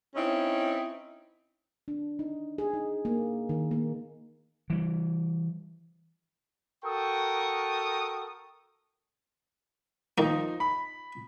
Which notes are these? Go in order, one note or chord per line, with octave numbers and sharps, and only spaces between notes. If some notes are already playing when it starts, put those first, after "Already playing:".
C4 C#4 D#4 E4
D4
D#4
G#4
D#4
A#3
D#3
A#3
E3 G3
F#4 A4 A#4 G5 C#6 D#6
D#3 F3 A#3 D#4
B5